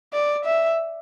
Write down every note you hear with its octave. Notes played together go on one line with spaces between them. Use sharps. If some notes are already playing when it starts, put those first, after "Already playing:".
D5
E5